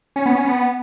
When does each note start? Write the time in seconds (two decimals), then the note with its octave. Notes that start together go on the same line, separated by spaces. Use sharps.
0.16 C#4
0.26 B3
0.35 C#4
0.45 B3